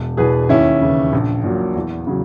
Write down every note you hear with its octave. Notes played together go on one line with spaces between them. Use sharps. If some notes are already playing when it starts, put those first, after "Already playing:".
Already playing: E1
E2 B2 G#4 B4
D#2 C#4 E4
C#3 E3
A#1
A#2 F#3
E2
C#3 F#3